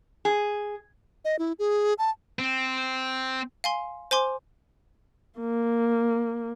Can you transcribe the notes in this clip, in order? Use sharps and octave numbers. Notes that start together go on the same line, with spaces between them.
G#4
D#5
E4
G#4
A5
C4
F5 G#5 C6
C5 G#5 C6 D6
A#3